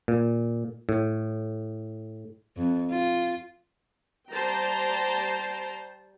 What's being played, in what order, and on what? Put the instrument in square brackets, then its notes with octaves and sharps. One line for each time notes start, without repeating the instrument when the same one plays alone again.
[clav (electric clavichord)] A#2
A2
[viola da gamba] F2
F4
[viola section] G3 C5 G5 A5 A#5